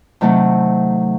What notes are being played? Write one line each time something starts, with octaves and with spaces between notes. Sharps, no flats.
C3 D#3 F#3 A3 A4